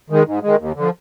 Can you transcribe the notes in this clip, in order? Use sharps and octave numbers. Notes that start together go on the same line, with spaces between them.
D#3 G#3
G#2
D#3 G#3
D#2
D3 F3